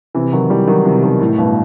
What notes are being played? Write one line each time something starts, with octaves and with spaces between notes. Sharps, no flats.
C3 E3
D#3 F#3
E3 G3
D#3 F#3
C3 E3
B2 D#3
A2
G2 B2